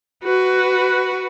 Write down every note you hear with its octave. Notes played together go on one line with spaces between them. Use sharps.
F#4 B4